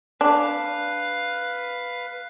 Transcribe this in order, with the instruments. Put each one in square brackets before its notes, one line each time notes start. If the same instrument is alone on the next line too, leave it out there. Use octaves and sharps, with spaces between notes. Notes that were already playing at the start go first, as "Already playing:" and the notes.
[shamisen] D4 [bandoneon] B4 [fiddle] F5